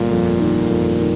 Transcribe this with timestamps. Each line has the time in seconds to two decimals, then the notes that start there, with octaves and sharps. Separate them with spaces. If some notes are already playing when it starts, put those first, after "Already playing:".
Already playing: G1 A#2
0.11 F2
0.39 D#3
0.70 F2
1.00 D#3